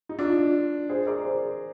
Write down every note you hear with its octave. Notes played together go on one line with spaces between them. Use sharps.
D#4
D4 F4
G#4 C5
A#4 D5
G#4 C5